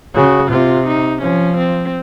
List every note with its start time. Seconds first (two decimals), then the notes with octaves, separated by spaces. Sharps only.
0.14 C#3 F#4
0.50 C3 F4
0.86 D#4
1.21 F3 C#4
1.57 C4